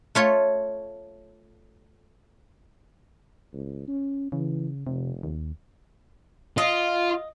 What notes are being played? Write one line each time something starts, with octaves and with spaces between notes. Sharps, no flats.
A3 F4 C#5
C#2
C#4
C#3 E3
F1 C3
D#2
F4 D#5